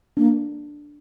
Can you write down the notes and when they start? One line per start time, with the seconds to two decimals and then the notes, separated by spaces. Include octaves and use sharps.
0.17 A#3 D4